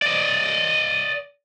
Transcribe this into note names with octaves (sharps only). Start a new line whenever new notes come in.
D5 D#5